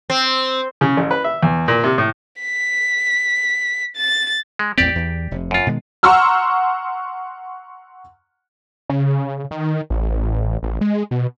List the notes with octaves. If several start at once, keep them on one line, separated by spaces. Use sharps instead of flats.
C4
C#3
A1
B4
E5
E2
A#2
C3
A2
B6
A6
G#3
A1 E2 C4 G4 D5
E2
F1 C3
F#2 F4
B2 D#3 G#3
F#5 A#5 C6 C#6 E6 F6
C#3
D#3
A1
A1
G#3
B2